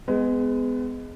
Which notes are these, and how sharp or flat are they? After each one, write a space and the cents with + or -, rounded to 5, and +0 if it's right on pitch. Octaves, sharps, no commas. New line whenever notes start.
G#3 +0 B3 +25